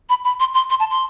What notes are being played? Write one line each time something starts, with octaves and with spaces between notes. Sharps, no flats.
B5
B5
C6
C6
C6
A5
C6